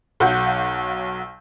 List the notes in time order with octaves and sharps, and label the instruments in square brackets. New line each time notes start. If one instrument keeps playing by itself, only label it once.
[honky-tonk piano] B1 F#3 F5 F#5 G6